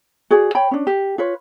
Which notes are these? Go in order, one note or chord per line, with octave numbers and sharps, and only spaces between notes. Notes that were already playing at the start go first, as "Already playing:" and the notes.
F#4 G#4 D5
C#5 G5 B5
C#4 D4
G4
F4 B4 C#5